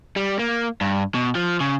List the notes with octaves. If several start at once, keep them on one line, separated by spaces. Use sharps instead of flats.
G3
A#3
G2
B2
F3
C#3